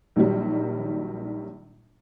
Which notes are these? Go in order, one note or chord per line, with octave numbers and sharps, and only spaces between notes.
A#1 D#3 F#3 G3